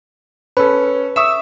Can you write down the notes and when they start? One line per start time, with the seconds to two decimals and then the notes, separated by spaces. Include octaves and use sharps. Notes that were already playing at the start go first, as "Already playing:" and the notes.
0.57 C#4 A4 B4
1.16 E5 C#6 D#6 E6